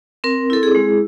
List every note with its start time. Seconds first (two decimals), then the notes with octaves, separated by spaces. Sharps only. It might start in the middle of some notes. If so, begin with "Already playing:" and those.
0.24 C4 A#4
0.50 E4 A4
0.63 G#4
0.75 G#3